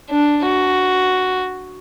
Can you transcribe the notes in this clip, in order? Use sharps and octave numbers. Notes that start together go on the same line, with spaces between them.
D4
F#4